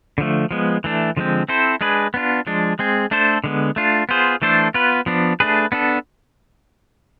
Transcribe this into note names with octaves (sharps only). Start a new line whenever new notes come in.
D3 F3 A3
F3 G#3 B3
E3 A3 D4
D3 F3 G#3 C4
C4 E4 A4 C5
G#3 D4 G#4 B4
B3 D4 F4
F3 G#3 D4
G#3 C4 G#4
A3 D4 A4 C5
D3 G#3 B3
A3 D4 F4
B3 F4 G#4 C5
E3 A3 D4 A4 C5
B3 F4 B4
F3 B3 D4
A3 D4 G#4 B4
B3 D4 A4